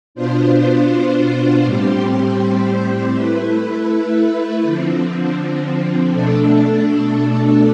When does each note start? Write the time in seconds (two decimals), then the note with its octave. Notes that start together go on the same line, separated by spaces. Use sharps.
0.15 B2 B3 D4 F4 C5
1.64 A2 G3 C4 G4 C5
3.13 A3 E4 B4
4.63 D3 F3 C4
6.12 B2 A3 D4 A4